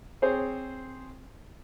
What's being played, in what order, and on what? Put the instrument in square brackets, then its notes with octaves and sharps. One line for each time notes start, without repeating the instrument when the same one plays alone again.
[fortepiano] C4 G#4 C5 C#5